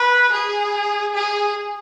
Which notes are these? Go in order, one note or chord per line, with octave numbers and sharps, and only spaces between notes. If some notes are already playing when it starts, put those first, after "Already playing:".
Already playing: B4
G#4
G#4